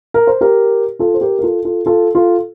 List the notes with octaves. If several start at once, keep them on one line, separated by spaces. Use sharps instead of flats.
A#4
C5
G4 A#4
F4 A4
C5
G4 A#4
A#4
F4 A4
F4 A4
F4 A4
F4 A4